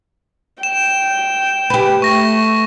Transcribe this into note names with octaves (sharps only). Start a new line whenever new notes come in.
G5 E7
G4 B4
A3 C#6 A#6